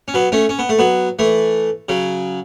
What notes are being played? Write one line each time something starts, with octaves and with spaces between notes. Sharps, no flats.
C#4
F#3 B3
A3 C#4
C#4
B3
A3
F#3 B3
E3 A3
C#3 F#3